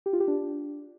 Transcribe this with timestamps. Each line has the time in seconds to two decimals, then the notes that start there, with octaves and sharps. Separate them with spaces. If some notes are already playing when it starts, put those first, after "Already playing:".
0.06 G4
0.13 F4
0.20 G4
0.28 D4